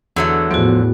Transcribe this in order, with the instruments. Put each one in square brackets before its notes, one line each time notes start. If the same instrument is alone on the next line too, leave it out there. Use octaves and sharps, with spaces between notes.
[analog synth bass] E2 [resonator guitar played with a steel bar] D3 F#3 A3
[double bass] E2 A2 [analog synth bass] F3 [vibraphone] B3 F#4